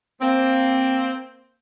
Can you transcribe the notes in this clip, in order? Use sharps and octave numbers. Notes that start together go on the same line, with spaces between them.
A#3 C4